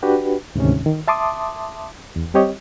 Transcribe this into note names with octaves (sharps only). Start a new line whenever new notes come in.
D4 F#4 G4 B4
D2 G#2 C3 D#3 C#4
D#3
E5 A5 C6 D6 D#6
E2
G3 C4 G4 C#5 D#5